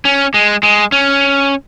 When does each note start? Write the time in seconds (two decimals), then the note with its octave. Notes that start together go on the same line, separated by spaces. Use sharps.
0.05 C#4
0.34 G#3
0.63 G#3
0.92 C#4